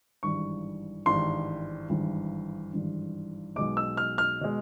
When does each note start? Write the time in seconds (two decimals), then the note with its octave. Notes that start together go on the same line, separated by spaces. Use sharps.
0.23 G#1 G2 E3 G3 C#6
1.06 G#1 G2 E3 G3 C6
1.89 G#1 G2 E3 G3
2.73 G#1 G2 E3 G3
3.56 B1 B2 G#3 D6
3.77 E6
3.97 F6
4.18 F6
4.41 B2 G#3